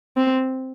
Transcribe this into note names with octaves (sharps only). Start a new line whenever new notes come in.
C4